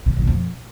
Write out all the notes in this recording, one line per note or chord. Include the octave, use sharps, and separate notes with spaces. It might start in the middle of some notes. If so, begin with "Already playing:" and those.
C3
D3
A#2
B2
F2